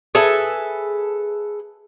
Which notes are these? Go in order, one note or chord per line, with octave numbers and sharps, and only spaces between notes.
G#4 A4 B4 E5